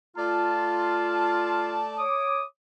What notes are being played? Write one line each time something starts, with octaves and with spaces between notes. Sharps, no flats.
A3 F4 D5 A5
C#5 D6 D#6